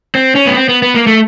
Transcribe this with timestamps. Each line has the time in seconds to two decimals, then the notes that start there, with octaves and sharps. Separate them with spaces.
0.15 C4
0.35 C#4
0.46 B3
0.56 C4
0.69 B3
0.82 B3
0.95 A#3
1.07 A3